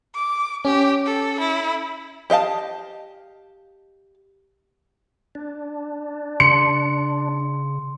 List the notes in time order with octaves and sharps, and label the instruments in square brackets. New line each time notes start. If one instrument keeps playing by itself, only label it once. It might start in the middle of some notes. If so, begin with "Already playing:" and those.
[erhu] D6
[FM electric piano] C#4 [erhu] G4
[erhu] A4
E4
[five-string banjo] G4 D#5 F5 A5
[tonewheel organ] D4
[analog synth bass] C#3 [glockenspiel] C6 [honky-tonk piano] C#7